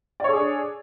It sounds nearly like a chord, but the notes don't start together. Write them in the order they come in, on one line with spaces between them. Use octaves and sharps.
D5 C#5 A4 G#4 D4